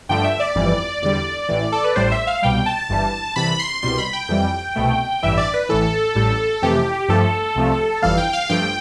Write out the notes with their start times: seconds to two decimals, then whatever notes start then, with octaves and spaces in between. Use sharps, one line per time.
0.09 G2 D3 F3 A3 G5
0.24 E5
0.40 D5
0.55 G1 F2 E3 G3
1.02 E2 D3 G3 D5
1.49 A1 A2 E3
1.72 A4
1.84 B4
1.96 A1 A2 G3 C5
2.11 E5
2.27 F5
2.42 C2 B2 G3 G5
2.66 A5
2.89 G1 G2 E3 G3
3.36 C2 C3 E3 B5
3.59 C6
3.82 C2 B2 G3 C6
3.98 B5
4.13 G5
4.29 F2 E3 G3
4.76 C2 B2 A3
5.23 A1 G2 E3 E5
5.37 D5
5.54 B4
5.69 A1 A2 E3 A4
6.15 A1 A2 G3
6.62 F2 C3 E3 A3 G4
7.09 G2 F3 A3 A4
7.55 C2 C3 F3 A3
8.02 G1 F2 E3 G3 F5
8.18 G5
8.33 F5
8.49 G2 F3 A3 G5